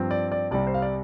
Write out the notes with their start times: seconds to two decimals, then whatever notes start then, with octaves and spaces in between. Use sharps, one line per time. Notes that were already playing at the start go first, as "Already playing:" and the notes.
Already playing: G2 F3 C4
0.11 D5
0.32 D5
0.51 C2 C3 G3 D5
0.67 C5
0.74 F5
0.82 D5